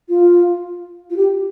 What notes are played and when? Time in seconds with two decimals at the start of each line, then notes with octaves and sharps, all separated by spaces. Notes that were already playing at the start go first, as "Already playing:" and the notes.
0.09 F4
1.10 F4
1.16 G4